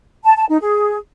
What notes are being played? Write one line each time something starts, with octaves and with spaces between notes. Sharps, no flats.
A5
A5
D#4
G#4